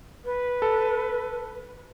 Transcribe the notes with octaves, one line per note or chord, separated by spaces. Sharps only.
B4
A4